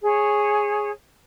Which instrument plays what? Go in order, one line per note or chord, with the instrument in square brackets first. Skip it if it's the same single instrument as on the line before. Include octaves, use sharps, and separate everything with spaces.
[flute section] G#4 C#5